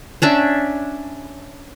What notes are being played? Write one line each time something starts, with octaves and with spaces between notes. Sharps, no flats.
C#4 D4 E5